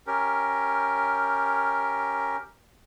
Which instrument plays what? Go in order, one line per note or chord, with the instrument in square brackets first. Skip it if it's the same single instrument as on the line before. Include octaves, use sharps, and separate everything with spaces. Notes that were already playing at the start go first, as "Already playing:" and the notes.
[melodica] C#4 G4 A#4